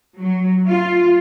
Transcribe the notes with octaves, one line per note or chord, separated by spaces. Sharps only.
F#3
F4